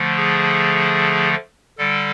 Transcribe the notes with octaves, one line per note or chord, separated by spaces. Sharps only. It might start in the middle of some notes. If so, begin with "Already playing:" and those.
Already playing: D3 F3 A3
G#4
D3 G3 A4